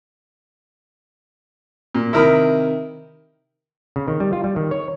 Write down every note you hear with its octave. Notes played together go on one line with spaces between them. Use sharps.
A#2
C3 D#3 E4 A#4 B5 D#6
C#3
D#3
G3
F4
G3
D#3
C#5